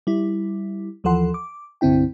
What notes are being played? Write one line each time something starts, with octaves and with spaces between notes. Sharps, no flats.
G3 E4
D#2 E3 F3 A4 F#5 C6
D6
C2 G2 D3 C4 E4 G5